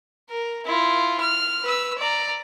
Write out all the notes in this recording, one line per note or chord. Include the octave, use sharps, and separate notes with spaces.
A#4
E4 F4
F6
B4 E6
D5 A#5